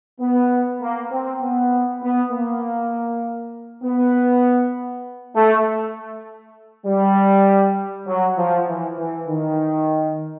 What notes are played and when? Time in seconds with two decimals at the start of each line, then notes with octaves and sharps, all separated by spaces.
0.20 B3
0.81 A#3
1.12 C4
1.42 B3
2.02 B3
2.32 A#3
3.84 B3
5.35 A3
6.86 G3
8.07 F#3
8.38 F3
8.67 E3
8.98 E3
9.28 D#3